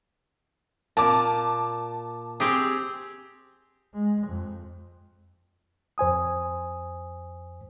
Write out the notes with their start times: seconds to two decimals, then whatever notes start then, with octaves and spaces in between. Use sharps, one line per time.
0.97 A#2 A5 D6
2.40 C4 G4 G#4
3.93 G#3
4.27 F2
5.98 F2 C5 G#5 D#6